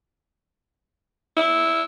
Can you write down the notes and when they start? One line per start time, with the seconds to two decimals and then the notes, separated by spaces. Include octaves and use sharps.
1.37 E4